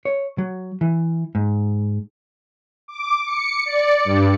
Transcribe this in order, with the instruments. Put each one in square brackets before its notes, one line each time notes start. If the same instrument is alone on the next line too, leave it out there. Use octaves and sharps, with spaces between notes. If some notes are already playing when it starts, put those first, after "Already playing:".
[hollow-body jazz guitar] C#5
F#3
E3
G#2
[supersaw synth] D6
C#7
D5
G2